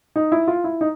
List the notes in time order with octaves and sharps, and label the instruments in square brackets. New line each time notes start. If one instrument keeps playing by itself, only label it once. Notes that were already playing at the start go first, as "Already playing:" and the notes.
[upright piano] D#4
E4
F4
E4
D#4